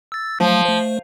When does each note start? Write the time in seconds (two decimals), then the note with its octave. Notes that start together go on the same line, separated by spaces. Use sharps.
0.12 E6 A6
0.40 F3 F#3 A3
0.65 A3 C5